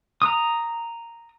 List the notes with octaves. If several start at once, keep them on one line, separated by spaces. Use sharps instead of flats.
A#5 D#6